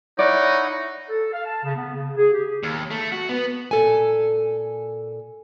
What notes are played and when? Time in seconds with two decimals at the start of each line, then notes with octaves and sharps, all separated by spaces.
0.19 D#4 E4 C#5 D5 F#5
1.09 A4
1.33 F5
1.45 A5
1.64 C#3
1.76 B3
1.95 C#3
2.17 G#4
2.32 G4
2.63 D#2
2.91 A3
3.12 F#4
3.29 B3
3.71 A#2 A4 G#5